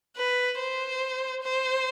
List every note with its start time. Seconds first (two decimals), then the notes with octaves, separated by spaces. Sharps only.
0.17 B4
0.59 C5
1.44 C5